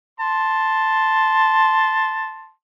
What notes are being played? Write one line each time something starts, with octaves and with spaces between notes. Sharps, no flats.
A5 C6